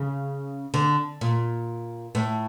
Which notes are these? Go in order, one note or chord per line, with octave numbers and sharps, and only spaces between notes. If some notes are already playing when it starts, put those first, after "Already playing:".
Already playing: C#3
D3
A#2
A2